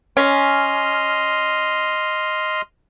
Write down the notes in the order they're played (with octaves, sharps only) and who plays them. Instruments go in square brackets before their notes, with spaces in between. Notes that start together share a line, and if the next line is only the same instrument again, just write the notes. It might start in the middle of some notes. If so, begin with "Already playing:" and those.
[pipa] C#4 [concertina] D#5 C6 F6